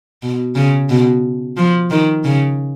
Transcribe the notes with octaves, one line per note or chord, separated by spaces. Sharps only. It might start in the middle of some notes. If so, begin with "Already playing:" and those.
B2
C#3
B2
F3
D#3
C#3